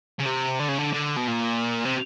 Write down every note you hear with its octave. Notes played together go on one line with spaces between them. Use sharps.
C#3
C3
D3
C#3
D3
D3
B2
A#2
C3